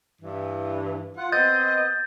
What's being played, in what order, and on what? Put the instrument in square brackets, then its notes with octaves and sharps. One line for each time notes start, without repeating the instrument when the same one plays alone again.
[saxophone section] G2 E3
F4 F#5
[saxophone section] B3 C4 D#5 [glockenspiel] G6 A6